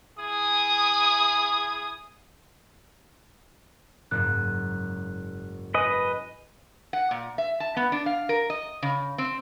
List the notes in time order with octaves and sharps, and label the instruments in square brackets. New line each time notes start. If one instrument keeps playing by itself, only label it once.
[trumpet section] E4 G#4 G#5 D#6
[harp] F#1 G#2 [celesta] F#6
[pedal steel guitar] B4 D#5 [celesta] G#5
[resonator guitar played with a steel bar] F#5
A#2
E5
A5
B3
D4
F5
A#4
D#5
C#3
C4